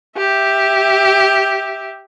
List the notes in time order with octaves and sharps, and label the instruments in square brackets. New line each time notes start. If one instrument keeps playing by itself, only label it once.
[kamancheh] G4 E5